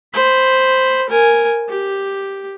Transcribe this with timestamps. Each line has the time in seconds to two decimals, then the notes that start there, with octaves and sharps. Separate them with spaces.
0.14 C5 B5
1.09 A#4 G#5
1.69 G4